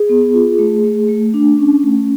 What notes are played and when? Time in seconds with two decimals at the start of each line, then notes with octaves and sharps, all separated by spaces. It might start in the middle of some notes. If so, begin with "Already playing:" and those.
Already playing: G#4
0.09 B3
0.34 F4
0.59 A3
0.84 A3
1.09 A3
1.34 D4
1.59 C#4
1.84 A3